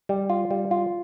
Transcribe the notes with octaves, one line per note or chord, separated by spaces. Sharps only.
G3
F4
G3
F4